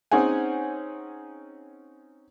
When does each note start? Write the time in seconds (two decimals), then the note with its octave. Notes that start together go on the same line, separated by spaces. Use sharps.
0.12 C4 C#4 D#4 G#4 F#5 G#5